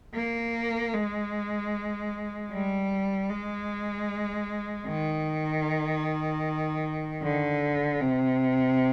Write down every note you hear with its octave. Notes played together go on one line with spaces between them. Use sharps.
A#3
G#3
G3
G#3
D#3
D3
C3